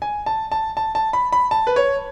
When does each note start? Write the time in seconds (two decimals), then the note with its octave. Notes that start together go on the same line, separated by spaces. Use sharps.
0.02 G#5
0.26 A5
0.52 A5
0.77 A5
0.95 A5
1.13 B5
1.32 B5
1.51 A5
1.67 B4
1.76 C#5